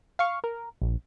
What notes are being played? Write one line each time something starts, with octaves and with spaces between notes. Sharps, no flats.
F5 C#6
A#4
A#1